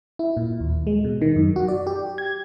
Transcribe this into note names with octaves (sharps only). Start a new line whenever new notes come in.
E4
A#2
D#2
G#3
B2
D#3
F#2
F#4
D5
G4
G#6